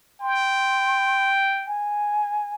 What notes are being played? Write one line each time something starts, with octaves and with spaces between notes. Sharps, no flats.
G5 C6
G#5